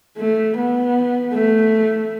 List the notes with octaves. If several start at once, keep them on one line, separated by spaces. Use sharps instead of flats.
A3
B3
A3